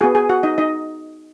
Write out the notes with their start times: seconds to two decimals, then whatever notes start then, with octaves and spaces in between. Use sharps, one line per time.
0.01 B3 F#4 G#4 G#5
0.15 G#4 G#5
0.29 F#4 F#5
0.43 D#4 D#5
0.58 D#4 D#5